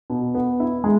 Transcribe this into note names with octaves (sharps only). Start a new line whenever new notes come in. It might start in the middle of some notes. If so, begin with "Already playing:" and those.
B2
B3
E4
G#3